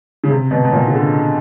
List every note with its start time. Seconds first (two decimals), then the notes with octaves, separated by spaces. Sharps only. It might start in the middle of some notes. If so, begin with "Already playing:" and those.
0.24 C#3
0.30 C3
0.51 B2
0.64 B2
0.72 A#2
0.87 C#3
0.94 D3